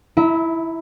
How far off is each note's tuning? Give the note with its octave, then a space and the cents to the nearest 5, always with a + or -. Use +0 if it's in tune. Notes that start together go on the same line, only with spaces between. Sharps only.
E4 +0 E5 -30 A#5 -5